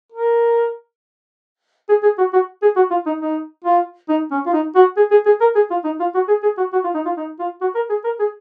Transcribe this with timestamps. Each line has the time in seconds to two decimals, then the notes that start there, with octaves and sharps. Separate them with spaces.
0.12 A#4
1.89 G#4
2.03 G#4
2.18 F#4
2.33 F#4
2.62 G#4
2.76 F#4
2.91 F4
3.06 D#4
3.21 D#4
3.64 F4
4.09 D#4
4.31 C#4
4.46 F4
4.53 D#4
4.75 F#4
4.97 G#4
5.11 G#4
5.26 G#4
5.41 A#4
5.55 G#4
5.71 F4
5.84 D#4
6.00 F4
6.14 F#4
6.28 G#4
6.43 G#4
6.58 F#4
6.73 F#4
6.84 F4
6.94 D#4
7.05 F4
7.17 D#4
7.39 F4
7.61 F#4
7.75 A#4
7.90 G#4
8.04 A#4
8.20 G#4